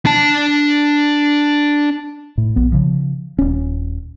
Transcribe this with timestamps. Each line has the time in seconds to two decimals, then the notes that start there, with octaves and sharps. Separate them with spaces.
0.05 D4 A5
2.38 A2
2.56 A#1 B3
2.72 C#3 F3
3.39 D#1 C#4